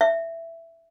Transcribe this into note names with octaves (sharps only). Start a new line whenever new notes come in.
E5